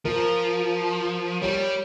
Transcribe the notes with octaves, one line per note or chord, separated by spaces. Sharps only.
F3 A#4
G3 C#5